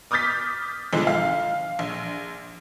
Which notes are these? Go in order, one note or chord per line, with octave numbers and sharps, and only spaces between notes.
D6 D#6 F6 G6 A6 B6
B1 D3 F3 G#3
F5
A#1